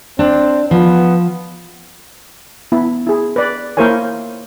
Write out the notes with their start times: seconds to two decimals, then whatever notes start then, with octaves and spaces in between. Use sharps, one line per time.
0.19 C4 D4
0.71 F3 B3
2.72 B3 E4
3.07 E4 G#4
3.36 B4 D5
3.77 A#3 E4 A#4 C5 C#5 G#5